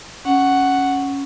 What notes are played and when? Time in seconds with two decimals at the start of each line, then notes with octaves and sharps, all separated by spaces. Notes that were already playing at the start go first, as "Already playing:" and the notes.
0.25 C#4 F#5